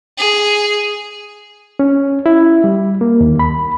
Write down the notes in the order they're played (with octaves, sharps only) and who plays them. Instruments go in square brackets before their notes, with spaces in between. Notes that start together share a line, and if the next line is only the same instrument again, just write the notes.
[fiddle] G#4
[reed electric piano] C#4
E4
G3
A#3
D#2
B5